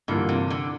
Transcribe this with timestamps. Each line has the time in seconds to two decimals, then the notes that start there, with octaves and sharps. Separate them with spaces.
0.08 G2 D3 E3 A#3 F4
0.29 C3
0.50 D3